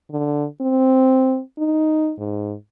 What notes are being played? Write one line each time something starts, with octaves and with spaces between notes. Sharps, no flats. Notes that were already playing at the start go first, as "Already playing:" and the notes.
D3
C4
D#4
G#2